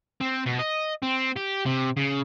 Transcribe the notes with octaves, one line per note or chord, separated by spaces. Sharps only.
C4
B2
D#5
C4
G4
C3
C#3